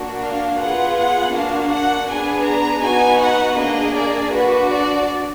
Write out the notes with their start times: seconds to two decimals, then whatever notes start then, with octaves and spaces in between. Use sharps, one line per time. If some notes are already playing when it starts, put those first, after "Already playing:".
Already playing: A#3 D4 F#4
0.22 F5
0.60 B3 F4 G#4 F#5
0.98 F#5
1.34 A#3 D4 F#4 F5
1.72 F#5
2.08 B3 D4 G#4 G#5
2.46 A#5
2.83 B3 D#4 F#4 G#5
3.21 F#5
3.58 A#3 D4 G#4 D#5
3.96 D5
4.33 D4 F#4 B4
4.70 D5